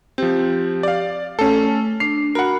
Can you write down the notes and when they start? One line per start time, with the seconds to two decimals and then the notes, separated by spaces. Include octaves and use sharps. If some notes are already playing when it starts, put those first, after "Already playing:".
0.18 F3 C4 G4
0.83 D5 F5
1.39 A3 C#4 A4
2.00 D4 C7
2.35 F#4 A#4 F#5 B5